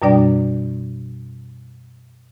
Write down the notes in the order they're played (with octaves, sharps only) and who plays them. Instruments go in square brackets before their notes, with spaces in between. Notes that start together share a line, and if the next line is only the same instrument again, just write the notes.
[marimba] F#2 B2 G3 D4 D5 G5